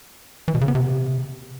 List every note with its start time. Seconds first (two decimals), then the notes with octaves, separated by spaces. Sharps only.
0.48 E3
0.55 B2
0.61 C#3
0.68 B3
0.75 C3